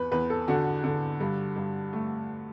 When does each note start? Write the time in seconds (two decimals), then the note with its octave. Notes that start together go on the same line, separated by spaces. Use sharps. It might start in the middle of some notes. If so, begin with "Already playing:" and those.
Already playing: E2 B4
0.12 E2 B4
0.30 A4
0.48 D3 F#4
0.84 D3
1.20 G2
1.56 G2
1.93 A3